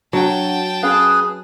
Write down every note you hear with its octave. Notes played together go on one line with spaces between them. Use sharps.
F#3 D4 F#4 F#5 G5 A5
C#4 G#4 B4 F5